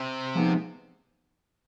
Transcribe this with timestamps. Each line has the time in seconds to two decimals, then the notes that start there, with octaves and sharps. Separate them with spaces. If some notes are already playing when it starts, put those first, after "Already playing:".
Already playing: C3
0.35 F3 G#3 B3 D#4